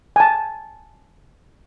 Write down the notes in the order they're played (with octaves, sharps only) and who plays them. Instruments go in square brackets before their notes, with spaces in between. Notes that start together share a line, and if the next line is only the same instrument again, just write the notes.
[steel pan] G#5 A5